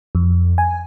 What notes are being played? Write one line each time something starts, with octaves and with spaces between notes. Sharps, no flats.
F2
G#5